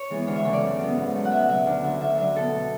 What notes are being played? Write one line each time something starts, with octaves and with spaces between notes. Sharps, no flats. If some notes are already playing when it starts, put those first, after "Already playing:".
Already playing: C#5
E3 G#3 B3
D2 C#5
E5
C#3 E3 A3 C#5
D5
F#2
C#3 F#3 B3
G#2
F#3 A3
F#5
B2 E5
F#3 A3 E5
D2
D3 A3 E5
D2 E5
D3 F#3 E5
B2 A4
A3